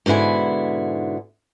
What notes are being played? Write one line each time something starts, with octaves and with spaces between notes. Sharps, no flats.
G#2 B2 D3 E4 G#5